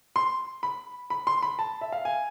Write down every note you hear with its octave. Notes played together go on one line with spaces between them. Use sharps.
C6
B5
B5
C6
B5
A5
E5
F5
G#5